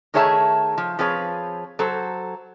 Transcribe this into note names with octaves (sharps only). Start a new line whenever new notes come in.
D#3 A3 G#4 C#5 E5 A5
F3
F3 C4 G#4 B4 C#5
F#3 A4 C5